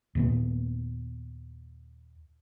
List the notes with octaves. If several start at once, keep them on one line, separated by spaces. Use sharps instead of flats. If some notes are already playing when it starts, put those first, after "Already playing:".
D#2 A#2 B3